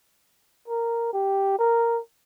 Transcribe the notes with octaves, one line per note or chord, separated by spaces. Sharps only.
A#4
G4
A#4